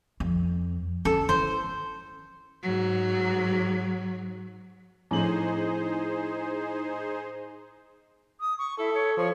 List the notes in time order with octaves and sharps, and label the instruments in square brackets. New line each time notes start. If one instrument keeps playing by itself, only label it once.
[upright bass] F2
[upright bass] C#4 [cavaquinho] A4
[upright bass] E3 [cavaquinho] C5
[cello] G#2 F#3
[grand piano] A2 F#7 [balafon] F3 C4 D4 [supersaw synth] D#4 G#4 C5
[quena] D#6
C#6
[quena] E4 [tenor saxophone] A4
[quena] C#5
[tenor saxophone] F3 [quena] C#5